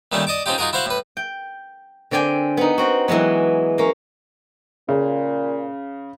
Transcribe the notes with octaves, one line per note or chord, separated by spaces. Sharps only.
A#2 D#3 G3 A3 C#4
D5 D#5 A5 D6
C4 C#4 D#4 F4 G4
D#4 F4 F#4 G#4 A#4
E4 F#4 C5 F5 F#5
A2 B4
G5
D3 C4 D5 G5 G#5
B3 D#4
C4 F#4
E3 F#3 G#3 B3
A#3 C#4
A#2 C#3